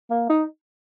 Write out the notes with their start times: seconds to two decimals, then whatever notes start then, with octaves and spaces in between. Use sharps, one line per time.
0.10 A#3
0.29 D#4